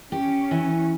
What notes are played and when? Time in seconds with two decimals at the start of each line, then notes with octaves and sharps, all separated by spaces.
0.12 C#4 G4
0.51 E3